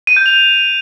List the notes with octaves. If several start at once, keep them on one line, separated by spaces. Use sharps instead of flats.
D#7
G6
F7